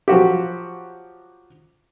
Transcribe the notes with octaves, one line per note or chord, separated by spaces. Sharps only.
F3 F#3 F#4 G4